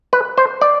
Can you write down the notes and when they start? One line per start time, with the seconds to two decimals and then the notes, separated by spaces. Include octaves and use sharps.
0.13 B4
0.38 C5
0.61 D5